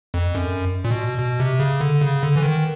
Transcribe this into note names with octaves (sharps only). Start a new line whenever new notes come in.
F2
F#2
A#2
B2
B2
C3
C#3
D3
C#3
D3
E3
D#3